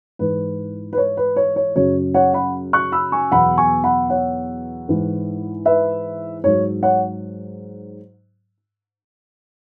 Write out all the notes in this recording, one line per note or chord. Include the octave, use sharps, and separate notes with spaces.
G#2 E3 B4
B4
C#5
B4
C#5
C#5
F#2 C#3 F#3 C#5
C#5 F#5
F#5 B5
C#6 F#6
B5 E6
G#5 C#6
E2 B2 F#3 F#5 B5
G#5 C#6
F#5 B5
C#5 F#5
G#2 E3
B4 E5
G#2 F#3 C#5
C#5 F#5